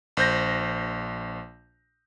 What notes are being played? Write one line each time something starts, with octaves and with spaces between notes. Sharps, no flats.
A#1 C5 G6 A#6